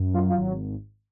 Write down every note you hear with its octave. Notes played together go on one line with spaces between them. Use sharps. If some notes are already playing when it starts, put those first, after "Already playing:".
Already playing: F#2
F#3 F4
F4
G#1